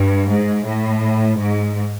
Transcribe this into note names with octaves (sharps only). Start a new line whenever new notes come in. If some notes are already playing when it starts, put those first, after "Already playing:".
Already playing: G2
G#2
A2
G#2